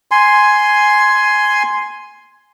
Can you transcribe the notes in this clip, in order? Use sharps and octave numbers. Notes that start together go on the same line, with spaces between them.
G#5 C6